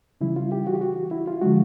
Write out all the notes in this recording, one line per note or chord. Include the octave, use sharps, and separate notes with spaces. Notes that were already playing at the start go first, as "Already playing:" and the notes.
C#3 E3 G3 E4
F4
G4
F#4
G4
F#4
E4
F4
D3 F3 G#3 F#4